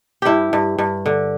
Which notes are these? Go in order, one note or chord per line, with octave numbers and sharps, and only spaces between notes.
G2 E4 G4
G2
G2
D3